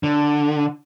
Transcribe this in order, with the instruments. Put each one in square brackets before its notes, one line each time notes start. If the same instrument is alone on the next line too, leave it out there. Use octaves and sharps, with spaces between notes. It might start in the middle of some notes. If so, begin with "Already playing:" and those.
[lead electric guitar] D3